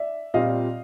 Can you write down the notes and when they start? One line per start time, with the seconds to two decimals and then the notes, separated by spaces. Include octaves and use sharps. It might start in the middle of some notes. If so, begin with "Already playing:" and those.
Already playing: D5 E5
0.34 A#2 G3 C4 F4 D#5 F5